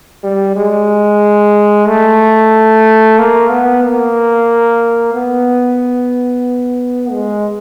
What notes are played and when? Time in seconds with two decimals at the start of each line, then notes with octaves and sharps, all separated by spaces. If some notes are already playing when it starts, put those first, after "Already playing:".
0.24 G3
0.56 G#3
1.88 A3
3.19 A#3
3.51 B3
3.83 A#3
5.14 B3
7.12 G#3